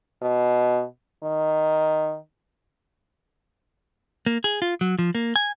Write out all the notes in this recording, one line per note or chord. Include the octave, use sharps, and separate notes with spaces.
B2
D#3
A#3
G#4
F4
F#3
F3
A#3
G#5